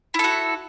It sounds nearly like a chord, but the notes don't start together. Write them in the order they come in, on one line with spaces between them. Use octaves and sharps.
E4 A4 F#4